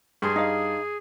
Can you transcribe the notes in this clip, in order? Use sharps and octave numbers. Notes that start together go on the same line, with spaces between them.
G2 G#4 C6
D#4 F5